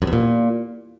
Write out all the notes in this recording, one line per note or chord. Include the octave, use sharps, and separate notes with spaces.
F#2
E2
A#2